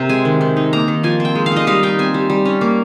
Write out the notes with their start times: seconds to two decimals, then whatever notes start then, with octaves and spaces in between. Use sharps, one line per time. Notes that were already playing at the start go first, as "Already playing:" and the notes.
Already playing: C3 C4 A#4 C5
0.09 G#3 G#5
0.25 D#3
0.41 D#3
0.57 D#4
0.73 A#3 A#5
0.88 D#3
1.03 F3 G#5
1.20 C4
1.25 G5
1.35 G#3
1.46 F5
1.52 D#4 D#5
1.67 G3 F5
1.83 D#4 G5
1.99 C4 G#5
2.14 G3
2.30 G3
2.45 C#4
2.61 A#3